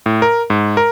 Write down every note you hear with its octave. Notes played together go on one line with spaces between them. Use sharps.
A2
A#4
G#2
A#4